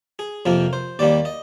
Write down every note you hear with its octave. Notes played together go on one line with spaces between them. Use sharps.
G#4
F2 C3 F3 A#3 A#4
C5
D#2 D#3 G3 A#3 D5
D#5